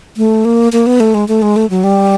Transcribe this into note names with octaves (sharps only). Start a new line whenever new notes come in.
A3
A#3
A#3
B3
A3
G#3
A3
G#3
A3
F#3
G3